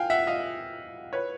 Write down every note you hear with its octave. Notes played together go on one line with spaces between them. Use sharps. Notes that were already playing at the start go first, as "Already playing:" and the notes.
Already playing: F5 G5 G#5
E5 F#5
D#5 F5
B4 C#5